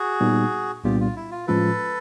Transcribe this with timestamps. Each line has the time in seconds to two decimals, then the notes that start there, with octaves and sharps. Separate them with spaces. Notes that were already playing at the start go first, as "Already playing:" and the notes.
Already playing: F#4 G#4
0.21 A#2 G3 B3 D#4
0.84 C2 A#2 G3 B3 D4 F4 G4
1.00 F4
1.16 E4
1.31 F4
1.47 A2 F3 G#3 C#4 F4 A4 B4